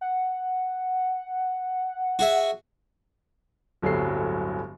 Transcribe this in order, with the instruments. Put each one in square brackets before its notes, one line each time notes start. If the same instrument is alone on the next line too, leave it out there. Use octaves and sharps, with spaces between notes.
[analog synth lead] F#5
[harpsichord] F#4 G#4 E5
[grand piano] D1 G1 F#3 G3 A4 C7